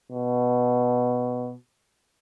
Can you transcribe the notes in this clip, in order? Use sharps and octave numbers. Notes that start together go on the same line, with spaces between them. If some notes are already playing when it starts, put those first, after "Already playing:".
B2